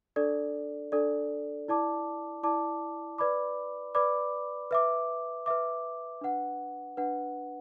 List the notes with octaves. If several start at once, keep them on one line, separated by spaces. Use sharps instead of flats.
D4 A4 D5
D4 A4 D5
E4 D5 A5 D6
E4 D5 A5 D6
B4 D5 B5 D6
B4 D5 B5 D6
B4 E5 D6
B4 E5 D6
D4 B4 F#5
D4 B4 F#5